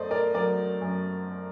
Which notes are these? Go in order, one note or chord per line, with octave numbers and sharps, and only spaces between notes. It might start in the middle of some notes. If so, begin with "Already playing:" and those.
Already playing: F#2 A3 C5 D5 D#5
A#4 D5
F#3 A#4 D5
F#2